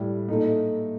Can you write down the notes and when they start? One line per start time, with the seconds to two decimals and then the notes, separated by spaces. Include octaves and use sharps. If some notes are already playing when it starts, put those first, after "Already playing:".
Already playing: A2 G3
0.28 A#2 A3 D#4